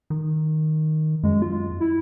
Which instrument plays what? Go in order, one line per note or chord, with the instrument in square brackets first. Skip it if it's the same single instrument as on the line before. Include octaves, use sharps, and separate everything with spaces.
[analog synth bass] D#3
[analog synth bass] F#2 [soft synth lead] G#3
[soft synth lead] F4
E4